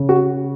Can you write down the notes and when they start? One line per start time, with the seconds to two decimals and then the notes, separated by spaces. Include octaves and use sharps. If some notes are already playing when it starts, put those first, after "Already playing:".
Already playing: C#3
0.09 F#4